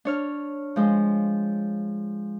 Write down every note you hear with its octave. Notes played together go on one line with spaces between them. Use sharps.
D4 C#5 F6
F3 G#3